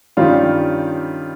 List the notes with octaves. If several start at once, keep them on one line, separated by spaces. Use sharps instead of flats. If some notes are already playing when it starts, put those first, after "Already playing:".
G2 D#3 G3 C#4 F4